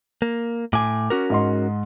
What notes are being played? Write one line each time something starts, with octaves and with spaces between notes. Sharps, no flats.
A#3
A2 G#5 D6
C#4 F#4 A#4
G#2 D#5 C6